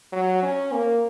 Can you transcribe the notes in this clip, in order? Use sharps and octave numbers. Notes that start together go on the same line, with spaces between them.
F#3
C#4
A#3